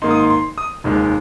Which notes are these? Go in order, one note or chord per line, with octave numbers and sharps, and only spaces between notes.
G#2 D#3 A#3 D#4 C6
D#6
C6
C6
D#6
F1 D#2 D#3 G#3